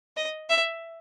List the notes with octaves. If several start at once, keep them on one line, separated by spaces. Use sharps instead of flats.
D#5
E5